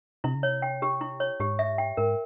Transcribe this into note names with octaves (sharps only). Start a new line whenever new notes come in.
C3 E4
C#3
C3 C#5
G5
G4
E4
C#5
G#2 G4
E5
G5
G#2 A#4